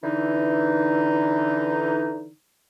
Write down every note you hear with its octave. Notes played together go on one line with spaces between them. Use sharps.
D3 E3 D#4